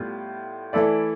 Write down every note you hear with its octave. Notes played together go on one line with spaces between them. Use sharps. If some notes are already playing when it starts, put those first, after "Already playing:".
Already playing: A2 G3 B3 F4
E3 A3 E4 A4 D5